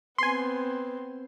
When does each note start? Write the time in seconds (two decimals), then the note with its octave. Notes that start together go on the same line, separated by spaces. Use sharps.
0.18 B3 C4 G#5 C6